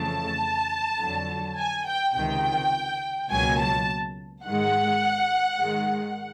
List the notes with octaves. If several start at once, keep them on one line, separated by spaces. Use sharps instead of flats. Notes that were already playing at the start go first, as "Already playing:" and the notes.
Already playing: F2 C#3 E3 A3 A5
F2 D3 F#3
G#5
G5
C#2 C3 D#3 G5
C#2 B2 F#3 A#3 G#5
A5
G#2 D#3 G#3 F#5
G#2 D#3 G#3